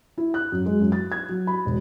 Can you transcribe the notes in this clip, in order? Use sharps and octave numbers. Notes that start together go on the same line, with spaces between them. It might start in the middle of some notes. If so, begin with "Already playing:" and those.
E4
F#6
F#2
G#3
F#2
A6
G#6
F#3
B5
E1